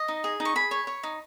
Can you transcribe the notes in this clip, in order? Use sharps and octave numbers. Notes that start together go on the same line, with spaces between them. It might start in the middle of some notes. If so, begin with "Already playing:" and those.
Already playing: D#5
D#4
G#4
D#4
C#6
G#4 B5
C#5
C#5
D#4